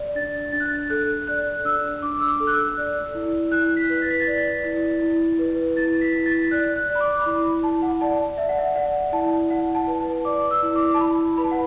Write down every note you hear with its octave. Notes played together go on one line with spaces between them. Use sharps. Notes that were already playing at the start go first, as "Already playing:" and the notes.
Already playing: D5
D4 A6
D4 A6
F#6
A6
A4 F#6
D5 F#6
D4 E6
D4 D6
E6
D6
A4
F#6
E6
D5
E4
E4 F#6
B6
B4
A6
B6
A6
D5
E4
E4
B4
E4 A6
B6
E4
A6
D5 F#6
F#6
D5
B5
D6
B5
E4 D6
E4 A5
F#5
D5 A5
D5 E5
F#5
E5
D5 F#5
E4 A5
E4 F#5
A5
B4
A5
D5 D6
E6
E4
D6
A5
E4 B5
B4 B5
A5
F#5